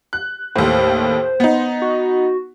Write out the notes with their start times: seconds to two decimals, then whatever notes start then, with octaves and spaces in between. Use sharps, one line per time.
0.13 F#6
0.56 D#2 A2 C5
1.40 B3 D#4
1.82 F#4